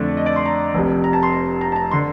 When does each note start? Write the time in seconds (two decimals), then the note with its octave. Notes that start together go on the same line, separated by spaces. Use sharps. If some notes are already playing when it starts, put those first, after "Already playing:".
Already playing: F2 D3 A3 D4
0.17 D#5
0.26 D5
0.36 C6
0.46 A#5
0.74 F1 F2 C3
1.04 A#5
1.13 A5
1.23 C6
1.33 A#5
1.61 A#5
1.72 A5
1.76 A#5
1.91 D3 C6